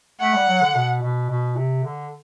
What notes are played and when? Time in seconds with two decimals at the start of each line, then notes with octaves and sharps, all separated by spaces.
0.20 A3 F#5
0.34 G3
0.47 F#3
0.61 D3
0.74 B2
1.01 B2
1.29 B2
1.56 C3
1.83 D3